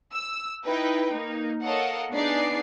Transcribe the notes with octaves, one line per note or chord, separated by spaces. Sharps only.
E6
D#4 E4 B4 G5
A#3 D#4
A4 A#4 C#5 D#5 F5 F#5
B3 D4 D#4 G#4 D5 C7